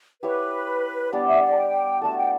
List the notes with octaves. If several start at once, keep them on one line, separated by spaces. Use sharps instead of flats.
E4 G4 B4 C#5
G3 B3 D4 G4 D5
E5
D5
A5
G5
A3 D4 F#4 A4 A5
G5